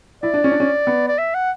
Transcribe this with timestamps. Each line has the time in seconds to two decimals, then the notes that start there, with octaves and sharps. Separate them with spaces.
0.23 E4 D5
0.34 D4
0.44 C#4
0.52 D4
0.60 C#4
0.87 B3
1.08 D5
1.18 E5
1.34 F#5